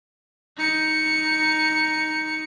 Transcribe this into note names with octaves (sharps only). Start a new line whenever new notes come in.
D#4 C#7